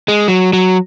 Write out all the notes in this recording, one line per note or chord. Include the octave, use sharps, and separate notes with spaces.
G#3
F#3
F#3